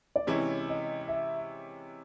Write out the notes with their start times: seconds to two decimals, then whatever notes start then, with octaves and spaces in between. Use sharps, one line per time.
0.16 D5
0.27 C3 E3 G#3 C#4 E4 C#5
0.68 D#5
1.08 E5